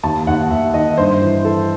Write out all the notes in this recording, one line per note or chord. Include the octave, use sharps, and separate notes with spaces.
D#2 A5
D#2 F#5
D#2 E5
D#3 D#5
G2 C5
E3
E3 A4